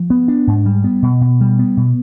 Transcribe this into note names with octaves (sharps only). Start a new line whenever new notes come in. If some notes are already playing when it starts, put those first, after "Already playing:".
Already playing: F3
B3
D4
G#2
G3
B3
B2
B2
G3
B3
B2